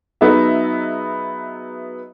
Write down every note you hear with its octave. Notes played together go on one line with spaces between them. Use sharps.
F#3 B3 D#4 G#4 D#5 E5